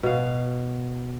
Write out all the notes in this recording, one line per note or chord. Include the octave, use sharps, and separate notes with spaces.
B2 F5